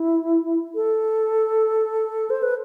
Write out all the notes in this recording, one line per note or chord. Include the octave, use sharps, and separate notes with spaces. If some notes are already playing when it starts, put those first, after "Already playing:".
Already playing: E4
A4
C5
B4